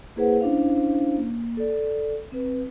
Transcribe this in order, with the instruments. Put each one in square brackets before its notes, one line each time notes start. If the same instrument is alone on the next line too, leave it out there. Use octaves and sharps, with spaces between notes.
[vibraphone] A#3 E4 G#4 B4 C5 F#5
C#4 D4 E4 C5 F5
A#3
A4 D5
C4 B4